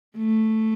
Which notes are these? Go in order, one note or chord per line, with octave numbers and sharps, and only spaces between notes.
A3